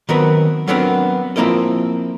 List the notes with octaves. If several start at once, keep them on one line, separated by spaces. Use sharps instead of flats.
D#3 F#3 B3 C4 A#4 B4
F#3 G3 B3 C4 D4 A#4
F3 A#3 C4 E4 A#4 D#5